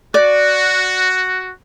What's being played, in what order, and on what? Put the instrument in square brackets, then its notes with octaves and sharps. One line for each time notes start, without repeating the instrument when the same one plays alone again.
[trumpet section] F#4 [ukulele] D5